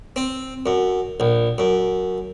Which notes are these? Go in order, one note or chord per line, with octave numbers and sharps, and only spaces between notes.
C4
F#2
A#1
F#2